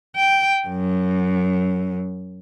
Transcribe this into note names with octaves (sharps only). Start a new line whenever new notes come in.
G5
F#2